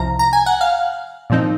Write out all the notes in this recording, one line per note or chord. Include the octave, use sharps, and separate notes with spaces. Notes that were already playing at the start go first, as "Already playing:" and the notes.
Already playing: C2 C3 F3 A#5
A#5
G#5
F#5
F5
A#2 F3 C4 D#4